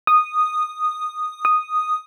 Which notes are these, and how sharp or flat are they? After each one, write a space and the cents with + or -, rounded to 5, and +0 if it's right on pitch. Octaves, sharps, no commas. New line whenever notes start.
D#6 -10
D#6 -5